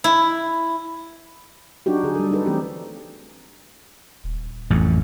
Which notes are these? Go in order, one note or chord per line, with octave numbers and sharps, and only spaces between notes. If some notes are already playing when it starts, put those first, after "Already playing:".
E4
F#3 D4 D#4 F#4 G4
D3 G#4
G3 A4
D#4 A4 B4
E3 A3 C4 G4
D#1
A1 F2